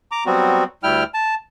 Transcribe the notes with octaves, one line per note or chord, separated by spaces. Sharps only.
A#5 D6
F#3 G3 B3 C4 F#4
D2 G3 E4 G5 F6
A5